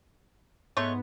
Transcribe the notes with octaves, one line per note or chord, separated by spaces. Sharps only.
G#2 A3 B3 C#5 C6